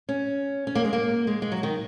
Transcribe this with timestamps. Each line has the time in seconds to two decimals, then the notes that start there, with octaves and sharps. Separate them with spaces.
0.09 C#4
0.67 C#4
0.75 A#3
0.84 G#3
0.93 A#3
1.27 G#3
1.42 G#3
1.52 F#3
1.63 D#3